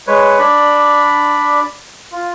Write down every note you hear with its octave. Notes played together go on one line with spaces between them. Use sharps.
G#3 B4 C#5
D4 D5 B5
F4